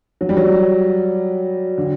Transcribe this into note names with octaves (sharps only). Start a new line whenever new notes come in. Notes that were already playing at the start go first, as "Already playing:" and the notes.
F#3
G3
F#3
D3